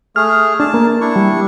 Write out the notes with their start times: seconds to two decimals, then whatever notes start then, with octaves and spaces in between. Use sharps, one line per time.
0.16 A3 G#4 F6
0.60 D4 A5
0.74 A#3
1.01 D4 E4 C#6
1.16 G3